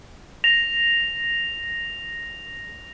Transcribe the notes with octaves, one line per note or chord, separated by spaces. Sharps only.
A#6 F7